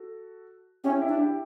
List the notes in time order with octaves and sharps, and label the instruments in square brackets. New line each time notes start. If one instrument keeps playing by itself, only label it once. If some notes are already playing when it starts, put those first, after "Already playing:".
Already playing: [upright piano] F#4 A4
[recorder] C#4 [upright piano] E4 G4
[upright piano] E4 G4
[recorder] D4
[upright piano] E4 G4